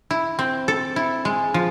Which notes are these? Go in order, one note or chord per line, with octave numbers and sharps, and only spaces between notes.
E4
C4
A4
E4
G#3
F3